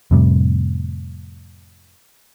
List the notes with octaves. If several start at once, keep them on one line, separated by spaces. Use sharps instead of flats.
F2 A2 C3 G3